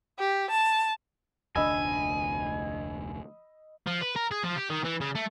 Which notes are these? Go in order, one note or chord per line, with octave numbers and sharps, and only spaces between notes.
G4
A5
F1 D2 D4 D#5 G#5 B5 E6
F3
B4
A#4
G#4
F3
G4
D#3
E3
C#3
A3